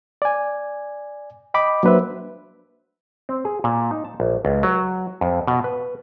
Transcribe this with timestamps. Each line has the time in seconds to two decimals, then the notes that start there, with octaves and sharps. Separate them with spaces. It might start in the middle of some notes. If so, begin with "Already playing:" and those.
0.22 D5 G#5
1.54 D#5 G5 B5 D6
1.83 F#3 A#3 D4 B4 C5 E5
3.29 C4
3.45 G#4
3.64 A#2
3.91 D#4
4.05 A5
4.20 A#1
4.45 C#2
4.63 F#3
5.21 F2
5.47 B2
5.64 B4